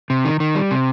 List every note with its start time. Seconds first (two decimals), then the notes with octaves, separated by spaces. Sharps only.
0.10 C3
0.25 D#3
0.40 D#3
0.55 G3
0.71 C3